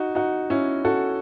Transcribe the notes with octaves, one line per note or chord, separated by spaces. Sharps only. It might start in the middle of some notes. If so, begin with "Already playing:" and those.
Already playing: D#4 F#4
D#4 F#4
C#4 E4
F#4 A4